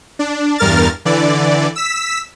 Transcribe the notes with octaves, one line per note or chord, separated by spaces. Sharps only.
D4
E2 G2 A#4 F6 A6
D3 E3 D5
E6 B6